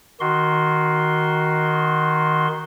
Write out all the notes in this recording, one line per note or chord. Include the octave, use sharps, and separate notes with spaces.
D#3 F#4 C6